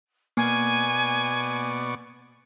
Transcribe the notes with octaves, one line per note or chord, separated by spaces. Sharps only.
B2 A#3 D5 G#5 C#6